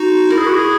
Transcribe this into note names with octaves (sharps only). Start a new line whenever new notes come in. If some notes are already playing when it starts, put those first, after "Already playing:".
Already playing: D#4 F#4
E4 A#4
G#4
F#4
G#4